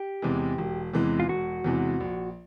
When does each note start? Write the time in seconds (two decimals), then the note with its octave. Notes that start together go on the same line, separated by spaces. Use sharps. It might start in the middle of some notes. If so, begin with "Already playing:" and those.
Already playing: G4
0.22 E2 C3 E3 G#3
0.58 E1
0.93 E2 C3 E3 G#3
1.20 F4
1.29 E1 F#4
1.64 E2 C3 E3 G#3
2.00 A#1